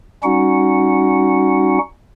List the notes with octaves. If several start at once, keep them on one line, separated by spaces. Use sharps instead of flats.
G3 C#4 D#4 F#4 F#5